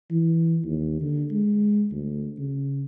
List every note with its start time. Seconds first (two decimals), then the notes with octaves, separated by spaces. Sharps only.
0.11 E3
0.65 D#2
1.02 D3
1.32 G#3
1.92 D2
2.38 C#3